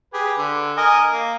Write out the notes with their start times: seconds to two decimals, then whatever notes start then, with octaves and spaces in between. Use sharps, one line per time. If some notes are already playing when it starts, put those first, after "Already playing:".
0.13 G4 G#4 B4
0.37 D3
0.77 A#4 D#5 G#5
1.10 A#3